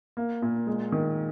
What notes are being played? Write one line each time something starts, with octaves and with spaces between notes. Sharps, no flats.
A#3
A#2
G#3
D#3